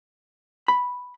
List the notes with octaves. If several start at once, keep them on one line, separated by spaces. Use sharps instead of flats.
B5